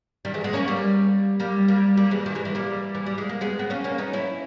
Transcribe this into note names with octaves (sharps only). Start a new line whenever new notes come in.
D#3 G3
E3 G#3
G#3 B3
A#3 C#4
G3 A#3
G3 A#3
G3 A#3
G3 A#3
E3 G#3
D#3 G3
E3 G#3
E3 G#3
G3 A#3
E3
G3
G#3
A#3
G#3 B3
B3
A#3 C#4
A#3 C#4
B3 D#4
C#4 E4